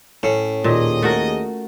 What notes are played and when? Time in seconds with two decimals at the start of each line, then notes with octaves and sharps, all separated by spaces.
0.23 A2 C#4
0.64 D#2 A#2 G#4 D#5
1.02 A3 F#4 A#4